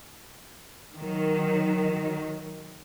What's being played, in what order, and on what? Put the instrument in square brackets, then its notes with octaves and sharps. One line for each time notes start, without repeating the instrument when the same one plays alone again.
[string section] D#3 F#3